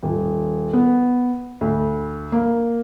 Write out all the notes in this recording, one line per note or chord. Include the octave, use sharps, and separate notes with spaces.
D#1
B3
D2
A#3